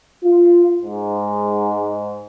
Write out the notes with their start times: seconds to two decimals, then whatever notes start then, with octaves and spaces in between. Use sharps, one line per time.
0.24 F4
0.83 G#2